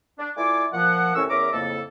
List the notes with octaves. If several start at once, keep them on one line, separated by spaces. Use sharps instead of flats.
D4
A3 E4 F4 D5 G#5 D6
A#2 F3 F#5
C2 A2 C#4 A#4 C#6 E6
E2 C#4 A#4 E5 A#5 D6
F2 A2 C#3 A#3 A4